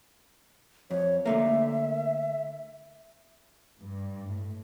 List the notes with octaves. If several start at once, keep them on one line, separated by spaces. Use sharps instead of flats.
F2 C#5
D3 A3 A#3 E5
G2
A2